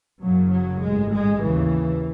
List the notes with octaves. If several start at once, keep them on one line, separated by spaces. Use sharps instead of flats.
F#1 F#2 C#3 F#3
F#3
A1 G#2 G#3
G#3
D#2 C#3 E3